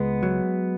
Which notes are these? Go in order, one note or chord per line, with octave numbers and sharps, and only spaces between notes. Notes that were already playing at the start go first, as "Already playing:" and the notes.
Already playing: C#2 G#3 B3
F#3